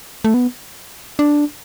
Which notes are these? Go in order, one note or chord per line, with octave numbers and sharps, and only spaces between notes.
A3
B3
D4